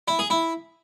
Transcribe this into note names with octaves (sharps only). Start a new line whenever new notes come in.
E4
G#4
E4